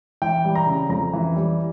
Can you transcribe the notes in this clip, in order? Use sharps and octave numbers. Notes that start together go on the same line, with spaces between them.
E3 G5
G3
A#5
C#3
F2 A#5
E3
G3